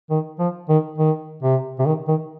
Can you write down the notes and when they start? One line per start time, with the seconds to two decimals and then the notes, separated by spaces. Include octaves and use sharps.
0.10 D#3
0.39 F3
0.69 D#3
0.98 D#3
1.43 C3
1.79 C3
1.86 D#3
2.08 D#3